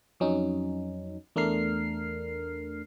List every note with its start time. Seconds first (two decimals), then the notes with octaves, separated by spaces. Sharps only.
0.20 F2 F#3 C#4 D#4
1.36 E2 A3 D4 A#4 F6 C7